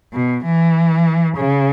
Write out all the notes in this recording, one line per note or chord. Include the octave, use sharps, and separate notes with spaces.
B2
E3
C#3